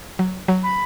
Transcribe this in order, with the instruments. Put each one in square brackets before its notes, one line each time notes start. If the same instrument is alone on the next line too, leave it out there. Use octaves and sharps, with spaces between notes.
[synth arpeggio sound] F#3
F#3
[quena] B5